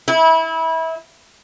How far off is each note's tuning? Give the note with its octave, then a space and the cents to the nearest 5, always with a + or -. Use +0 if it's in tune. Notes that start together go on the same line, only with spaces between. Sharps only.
E4 -25